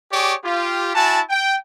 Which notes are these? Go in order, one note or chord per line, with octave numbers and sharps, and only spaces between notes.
G4 G#4 C#5 D5 C#6 D6
F4 G4
E4 F#4 G#5 A5
G5